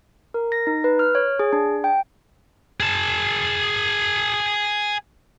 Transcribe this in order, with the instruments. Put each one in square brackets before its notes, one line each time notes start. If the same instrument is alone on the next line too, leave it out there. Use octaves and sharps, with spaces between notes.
[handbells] A#4
A#6
D#4
B4
F6
C#5
G#4
D4
G5
[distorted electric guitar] G#4 A5